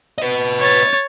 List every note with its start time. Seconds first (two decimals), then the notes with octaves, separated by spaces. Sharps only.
0.18 B4 D#5
0.59 C#5 A6